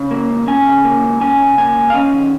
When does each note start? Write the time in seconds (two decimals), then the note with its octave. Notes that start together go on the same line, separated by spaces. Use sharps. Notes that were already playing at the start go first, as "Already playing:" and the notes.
Already playing: C#3
0.11 A#3
0.30 C#2
0.48 C#4 G#5
0.66 C#3
0.84 A#3
1.03 C#2
1.21 C#4 G#5
1.40 C#3
1.58 A#3 G#5
1.76 C#2
1.90 F5
1.94 C#4 D#5
2.13 D#3